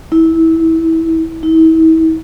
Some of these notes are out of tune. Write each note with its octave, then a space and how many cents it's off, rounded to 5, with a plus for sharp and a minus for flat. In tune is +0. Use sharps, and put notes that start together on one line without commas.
E4 -20
E4 -40